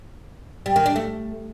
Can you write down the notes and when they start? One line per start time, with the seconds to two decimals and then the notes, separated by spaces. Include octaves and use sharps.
0.66 G3
0.76 D#3
0.86 D4
0.96 A3